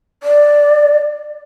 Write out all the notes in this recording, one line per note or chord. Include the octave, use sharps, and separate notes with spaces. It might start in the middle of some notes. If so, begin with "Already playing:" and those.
D5